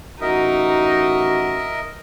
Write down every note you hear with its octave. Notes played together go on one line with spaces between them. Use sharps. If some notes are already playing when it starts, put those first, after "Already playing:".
A1 D#4 F#4 A#4 D#5 E5